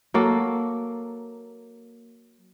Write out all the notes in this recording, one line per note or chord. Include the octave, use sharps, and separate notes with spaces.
F#3 A#3 A4